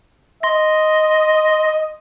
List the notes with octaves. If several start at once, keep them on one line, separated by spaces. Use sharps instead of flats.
D#5 C6 A#6